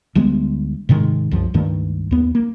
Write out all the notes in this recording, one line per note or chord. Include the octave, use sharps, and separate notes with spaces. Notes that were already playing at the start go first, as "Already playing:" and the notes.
D2 G3 G#3 B3
G#2 C3 D#3 G#3
C2 F#2 F3
C#2 G2 D#3 A3
D#2 B3
A#3